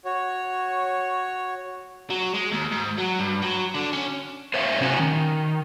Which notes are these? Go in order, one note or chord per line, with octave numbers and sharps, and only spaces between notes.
F#4 C#5
F#3
G#3
D#2
G#2
F#3
G2
F#3
D3
C#4
C5 C#5 E5 F5
C3 C#4 F#4 C5 F#5 G#5
D#3